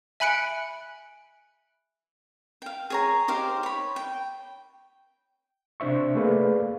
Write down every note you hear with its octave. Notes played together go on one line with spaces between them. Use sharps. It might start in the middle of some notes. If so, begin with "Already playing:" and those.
E5 G#5 B5 F#6 C#7 D7
F5 G5
G#4 C#5 A#5
D#4 G4 C5 F5
C#5 B5
G5
C3 D4 C5 E5 C#6
A3 A#3 G#4 B4 D5 F5